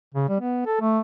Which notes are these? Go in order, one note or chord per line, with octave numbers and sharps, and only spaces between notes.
C#3
G3
B3
A4
A3